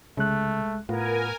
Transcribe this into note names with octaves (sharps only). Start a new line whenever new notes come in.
C2 C#3 G#3 A3 F#6
A2 B3 F4 A#4 G#5